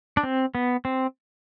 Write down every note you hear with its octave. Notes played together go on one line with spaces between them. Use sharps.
D4
C4
B3
C4